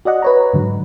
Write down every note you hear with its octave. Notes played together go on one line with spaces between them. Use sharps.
F#4 D5 D#5 F#5
B4 C#5 A#5
G#2 D3 F#3